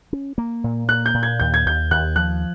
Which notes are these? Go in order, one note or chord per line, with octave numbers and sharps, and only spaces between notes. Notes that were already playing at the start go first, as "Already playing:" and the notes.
C#4
A#3
A#2
A#3 F#6
G6
A#2
G#6
D#2 G6
G#6
D#2 G6
D#2 F#6
F3 F#6